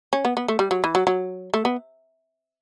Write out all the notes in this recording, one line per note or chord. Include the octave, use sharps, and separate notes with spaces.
C#4
B3
B3
A3
G3
F#3
E3
F#3
F#3
A3
B3